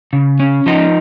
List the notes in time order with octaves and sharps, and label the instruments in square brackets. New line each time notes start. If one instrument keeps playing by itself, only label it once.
[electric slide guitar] C#3
C#4
F3 D#4